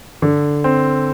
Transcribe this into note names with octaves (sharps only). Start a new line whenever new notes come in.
D3
C4